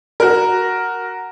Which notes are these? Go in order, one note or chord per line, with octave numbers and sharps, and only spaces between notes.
F#4 A#4